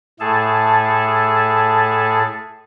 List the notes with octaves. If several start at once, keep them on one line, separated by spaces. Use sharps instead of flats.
A2 A3 G#4 A4 A5